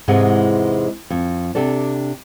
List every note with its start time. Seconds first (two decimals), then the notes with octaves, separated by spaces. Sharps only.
0.08 E2 G#2 C3 G#3 B3
1.10 F2
1.55 C3 D4 G4 A4 D5